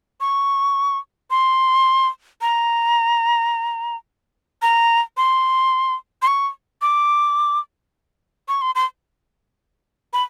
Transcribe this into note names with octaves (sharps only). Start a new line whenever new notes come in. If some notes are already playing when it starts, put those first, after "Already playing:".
C#6
C6
A#5
A#5
C6
C6
C#6
D6
C#6
C6
C6
B5